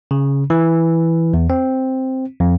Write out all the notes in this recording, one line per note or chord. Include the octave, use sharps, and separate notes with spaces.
C#3
E3
E2
C4
F2